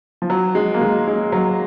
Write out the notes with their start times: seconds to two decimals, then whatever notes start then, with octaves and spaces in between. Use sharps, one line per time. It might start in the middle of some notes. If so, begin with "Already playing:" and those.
0.22 F3
0.30 F#3
0.55 G#3
0.74 A#3
0.81 G#3
1.08 G#3
1.32 F#3